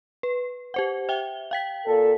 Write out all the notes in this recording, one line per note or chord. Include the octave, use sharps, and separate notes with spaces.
B4
G4 C5 F#5
E5 G5 G7
F5 G5 B6
A#2 A4